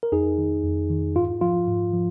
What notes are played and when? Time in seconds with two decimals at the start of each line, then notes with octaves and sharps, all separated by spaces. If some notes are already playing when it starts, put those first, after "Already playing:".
0.03 A#4
0.12 F2 D#4 G#4
0.38 D#3
0.64 F2
0.90 D#3
1.16 G#2 F4
1.41 F3 F4
1.67 G#2
1.93 F3